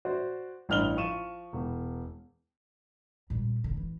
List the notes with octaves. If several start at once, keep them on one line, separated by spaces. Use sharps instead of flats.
F#4 C5 D5
A1 G2 F6 F7 G7
F3 C#6 D#7 E7
E1
A#2 G3
D3
E3